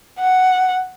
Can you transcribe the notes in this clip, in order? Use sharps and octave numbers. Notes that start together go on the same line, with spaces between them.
F#5